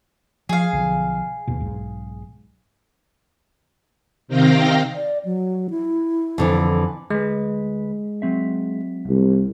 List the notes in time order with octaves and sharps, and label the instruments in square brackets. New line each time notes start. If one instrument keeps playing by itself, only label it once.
[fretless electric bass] F3 [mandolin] G#4 F5
[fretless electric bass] B1 D3 F3
D#2 B2
B1 G#2
[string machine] C3 D#3 C4 F5 G5 A#6
[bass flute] D5
F#3
E4
[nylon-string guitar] F2 D3 E3
[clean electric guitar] D2 B4 [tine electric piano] G#3
[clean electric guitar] F#3 C4 E5
[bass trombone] C2